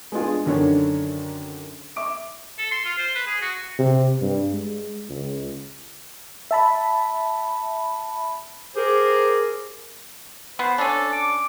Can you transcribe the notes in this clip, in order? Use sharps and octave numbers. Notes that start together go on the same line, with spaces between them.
G#3 B3 D4 F4 G#4
F#2 D3 D#3 D4 C#5
E5 D6 D7
A4
C6
F4
C5
B4
G#4
F#4
C3
G2
G#3
C#2
E5 A5 B5
G4 G#4 A#4 C5
B3 C5
C#4 D4 A4
D6